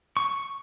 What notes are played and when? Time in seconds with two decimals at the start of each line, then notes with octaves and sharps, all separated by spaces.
0.17 C#6